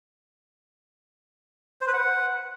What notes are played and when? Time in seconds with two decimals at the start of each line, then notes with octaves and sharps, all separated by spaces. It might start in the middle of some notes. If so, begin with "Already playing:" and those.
1.81 C5
1.87 B4
1.94 F#5